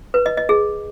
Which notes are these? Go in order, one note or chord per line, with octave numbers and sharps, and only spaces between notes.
B4
D#5
D#5
G#4